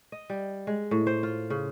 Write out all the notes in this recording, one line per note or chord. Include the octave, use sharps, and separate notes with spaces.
D#5
G3
G#3
A2
C5
F4
C#3